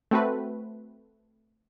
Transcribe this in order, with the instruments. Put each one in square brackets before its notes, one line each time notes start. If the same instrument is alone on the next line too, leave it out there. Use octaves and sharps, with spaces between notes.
[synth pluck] A3 C4 F#4 B4